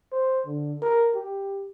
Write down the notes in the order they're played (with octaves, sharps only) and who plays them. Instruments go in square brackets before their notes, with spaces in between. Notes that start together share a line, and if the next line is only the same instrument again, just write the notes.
[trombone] C5
D3
A#4
G4